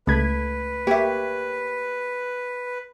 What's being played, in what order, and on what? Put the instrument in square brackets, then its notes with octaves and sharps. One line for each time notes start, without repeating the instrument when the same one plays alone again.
[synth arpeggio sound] C#2 G#6 [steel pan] A3 B5 [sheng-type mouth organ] B4
[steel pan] A#3 G4 [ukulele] C#5 E5